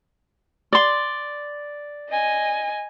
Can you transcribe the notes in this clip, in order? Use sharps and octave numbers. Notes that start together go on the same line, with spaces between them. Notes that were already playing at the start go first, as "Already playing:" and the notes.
D5 C6
D#5 G#5